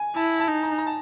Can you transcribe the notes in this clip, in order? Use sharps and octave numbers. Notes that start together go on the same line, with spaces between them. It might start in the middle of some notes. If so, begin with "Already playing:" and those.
Already playing: G#5
E4 A5
A5
D#4
A#5
A#5
A5